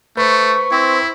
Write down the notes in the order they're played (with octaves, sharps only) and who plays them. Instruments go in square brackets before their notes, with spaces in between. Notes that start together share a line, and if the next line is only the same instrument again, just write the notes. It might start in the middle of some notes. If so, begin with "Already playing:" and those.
[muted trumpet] A3 [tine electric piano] B4 C5 [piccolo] C#6
[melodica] C4 [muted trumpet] E4